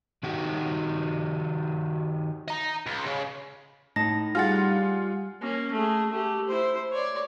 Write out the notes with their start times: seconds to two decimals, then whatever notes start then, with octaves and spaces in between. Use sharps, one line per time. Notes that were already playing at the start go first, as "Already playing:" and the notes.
0.23 D#3 D#4 F#4 G4
2.48 D#5 A#5
2.87 C#2
3.06 C#3
3.96 A2 D#4 A5 A#6
4.35 G3 F4 G#4 F#5 F6 A6
5.41 A#3 C#4
5.73 A3 G#4
6.11 A3 G4
6.47 E4 C5
6.92 C#5 D5